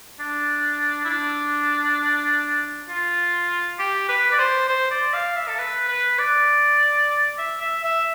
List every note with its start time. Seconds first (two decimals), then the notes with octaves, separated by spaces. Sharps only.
0.20 D4
1.05 E4
1.10 D4
2.89 F4
3.79 G4
4.09 B4
4.32 D5
4.39 C5
4.69 C5
4.91 D5
5.14 F5
5.36 E5
5.49 A4
5.59 B4
5.89 B4
6.19 D5
7.39 E5
7.61 E5
7.84 E5